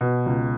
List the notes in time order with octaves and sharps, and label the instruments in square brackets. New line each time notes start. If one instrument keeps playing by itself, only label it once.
[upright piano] B2
C#2